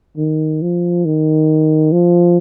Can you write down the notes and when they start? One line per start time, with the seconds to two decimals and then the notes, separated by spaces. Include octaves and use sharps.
0.17 D#3
0.62 F3
1.05 D#3
1.92 F3